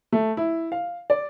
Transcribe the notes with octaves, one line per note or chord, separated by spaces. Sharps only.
A3
E4
F5
D5